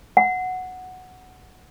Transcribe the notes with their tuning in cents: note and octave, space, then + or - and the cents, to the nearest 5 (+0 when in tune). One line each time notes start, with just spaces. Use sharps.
F#5 -5